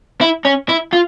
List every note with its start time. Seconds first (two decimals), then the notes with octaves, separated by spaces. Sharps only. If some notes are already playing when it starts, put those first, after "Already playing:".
0.21 E4
0.45 C#4
0.69 E4
0.93 F4